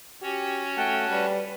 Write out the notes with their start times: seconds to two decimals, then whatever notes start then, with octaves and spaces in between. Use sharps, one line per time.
0.22 C#4 F#4 G4 C#5
0.77 A3 F#5 G5 A5
1.10 G3 B4